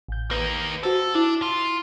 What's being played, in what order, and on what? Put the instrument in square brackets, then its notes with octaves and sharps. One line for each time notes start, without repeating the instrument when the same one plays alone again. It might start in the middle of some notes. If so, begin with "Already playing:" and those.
[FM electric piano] A1 G6
[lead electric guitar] A#3 D#4 [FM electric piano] B4
[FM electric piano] F#4 C5 [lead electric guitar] A4
[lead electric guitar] D4 [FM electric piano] E4
[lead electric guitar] F4